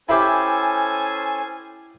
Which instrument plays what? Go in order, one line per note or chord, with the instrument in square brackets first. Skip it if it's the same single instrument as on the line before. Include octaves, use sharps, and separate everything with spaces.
[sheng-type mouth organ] C#4 A4 C5 [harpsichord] E4 G4 E5 [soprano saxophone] G#5